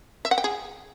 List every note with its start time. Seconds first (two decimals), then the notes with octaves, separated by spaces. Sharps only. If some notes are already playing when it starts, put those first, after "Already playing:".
0.25 E5
0.31 F#5
0.38 G5
0.44 G#4